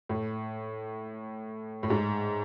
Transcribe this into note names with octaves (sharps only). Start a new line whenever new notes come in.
A2
A2
G#2